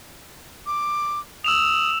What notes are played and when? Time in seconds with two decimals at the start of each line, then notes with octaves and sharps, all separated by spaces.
0.66 D6
1.44 D#6 E6 E7 F7